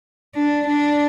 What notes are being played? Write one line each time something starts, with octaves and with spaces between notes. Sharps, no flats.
D4
D4